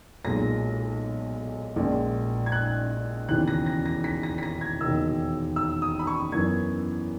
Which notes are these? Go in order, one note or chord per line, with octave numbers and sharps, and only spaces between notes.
B1 A#2 G#3 A#6
A#1 A#2 G#3 C#4
G#6
F#6
E1 D#2 C#3 E3 F#6
A#6
A#6
A#6
B6
A#6
B6
A#6
G#6
E1 D#2 D#3 E6
E6
D#6
B5
C#6
F#2 E3 B3 G#6